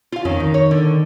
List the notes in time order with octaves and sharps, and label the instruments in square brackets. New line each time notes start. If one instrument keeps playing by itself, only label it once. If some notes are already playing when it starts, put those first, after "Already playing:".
[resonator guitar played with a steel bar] F4 F5
[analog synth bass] F2 [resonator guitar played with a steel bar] D#3 C#4
[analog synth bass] D#3 [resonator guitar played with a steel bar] D#4
[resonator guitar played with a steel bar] C#5
D3